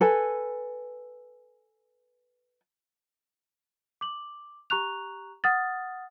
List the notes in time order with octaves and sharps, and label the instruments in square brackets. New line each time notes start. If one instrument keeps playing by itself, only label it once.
[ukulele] A4 B4 G#5
[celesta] D6 F#7
G4 A#5 C#6 F#6 F7
F#5 D#6 F6 A6